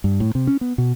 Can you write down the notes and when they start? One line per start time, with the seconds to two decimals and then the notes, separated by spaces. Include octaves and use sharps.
0.04 G2
0.20 A2
0.35 C3
0.47 C#4
0.61 B3
0.78 B2